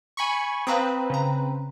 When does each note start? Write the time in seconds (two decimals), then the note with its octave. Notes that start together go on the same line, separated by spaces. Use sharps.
0.17 G#5 B5 C#6
0.67 C4 B4 F5 A#5 D#6
1.10 C#3 A#5